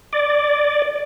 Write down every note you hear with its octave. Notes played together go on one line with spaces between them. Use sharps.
D5